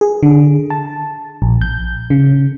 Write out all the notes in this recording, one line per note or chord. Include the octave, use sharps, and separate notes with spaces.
G#4
D3
A5
A#1
G6
C#3